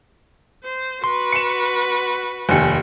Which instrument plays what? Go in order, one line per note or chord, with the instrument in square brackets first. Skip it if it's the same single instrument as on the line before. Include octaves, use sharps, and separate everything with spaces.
[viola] C5
[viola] F#4 B4 [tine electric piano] C6
[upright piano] C#7 E7
[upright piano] F1 D#2 [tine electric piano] G#5 C#7